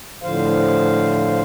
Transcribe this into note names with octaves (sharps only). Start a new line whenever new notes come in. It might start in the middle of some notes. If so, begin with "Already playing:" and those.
A2 D3 F3 C5 F5